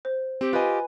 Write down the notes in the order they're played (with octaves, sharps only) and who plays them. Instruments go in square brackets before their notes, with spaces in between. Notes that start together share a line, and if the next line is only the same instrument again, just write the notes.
[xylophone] C5
[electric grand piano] C4 [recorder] G4
[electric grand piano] F4 D#5 [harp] B4 G#5